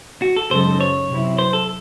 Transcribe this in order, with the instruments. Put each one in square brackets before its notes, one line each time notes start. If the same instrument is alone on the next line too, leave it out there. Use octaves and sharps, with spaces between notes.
[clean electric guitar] F#4
A4
[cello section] F#2 C#3 G#3 D#4 A4 [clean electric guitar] C5
[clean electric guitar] C#5
[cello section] C3 F#3 C4 E4
[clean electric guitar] C5
A4